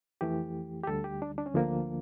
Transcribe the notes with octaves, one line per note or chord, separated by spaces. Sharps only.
F2 E3 A3 G4
G4
D2 D3 G3 A4
G4
D4
D4
C#4
D2 D3 F3 A#3 D4